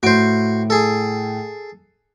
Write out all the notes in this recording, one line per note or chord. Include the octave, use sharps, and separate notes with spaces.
A2 F#4 C5 D7
G#4 A4